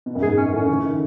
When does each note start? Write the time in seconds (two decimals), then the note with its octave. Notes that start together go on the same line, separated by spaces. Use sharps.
0.06 B2
0.15 F#2
0.22 G#2 G#4
0.37 C#4
0.53 A2 C#4
0.69 C#3
0.84 D#3